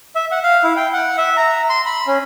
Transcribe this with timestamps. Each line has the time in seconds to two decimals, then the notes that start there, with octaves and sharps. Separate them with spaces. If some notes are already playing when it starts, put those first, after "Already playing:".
0.15 E5
0.31 F#5
0.43 F5
0.64 E4
0.77 G5
0.93 F#5
1.18 E5
1.37 A#5
1.70 C6
1.86 B5
2.07 C#4